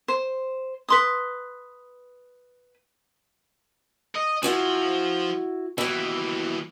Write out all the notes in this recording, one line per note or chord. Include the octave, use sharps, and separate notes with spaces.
C5
B4 C6 D#6
D#5
F3 E4 F#4 G#5
D#2 B2 E3 E4